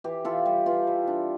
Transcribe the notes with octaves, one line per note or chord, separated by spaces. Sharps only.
E3 G4
E3 F4 A4
G3 G4
E3 F4
G3
D4